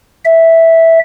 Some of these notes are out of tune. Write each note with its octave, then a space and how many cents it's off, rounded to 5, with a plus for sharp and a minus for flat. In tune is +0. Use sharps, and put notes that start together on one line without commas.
E5 -5